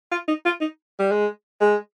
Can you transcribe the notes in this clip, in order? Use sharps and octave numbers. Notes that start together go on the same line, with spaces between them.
F4
D#4
F4
D#4
G3
G#3
G#3